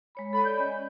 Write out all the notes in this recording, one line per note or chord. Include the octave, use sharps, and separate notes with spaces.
G#3 C#5 B5
A4 B5
C#5 D5 B5 G6
C#4 D#5 G#5